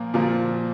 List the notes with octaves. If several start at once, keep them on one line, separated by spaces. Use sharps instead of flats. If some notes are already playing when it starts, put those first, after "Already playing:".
Already playing: A#2 F3 A#3
A#2 F3 A#3